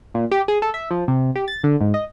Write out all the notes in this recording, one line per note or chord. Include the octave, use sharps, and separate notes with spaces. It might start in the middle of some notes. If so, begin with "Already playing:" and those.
A#2
G4
G#4
A4
E5
F3
C3
G4
A6
D3
G#2
D#5